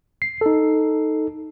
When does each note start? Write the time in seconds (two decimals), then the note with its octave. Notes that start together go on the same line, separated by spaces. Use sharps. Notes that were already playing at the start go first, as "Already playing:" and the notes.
0.22 C7
0.41 D#4 A4